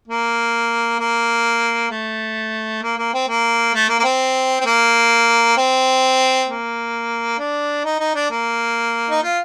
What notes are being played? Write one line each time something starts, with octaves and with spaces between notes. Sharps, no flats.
A#3
A#3
A3
A#3
A#3
C4
A#3
A3
A#3
A#3
C4
C4
A#3
C4
A#3
D4
D#4
D#4
D4
A#3
D#4
F4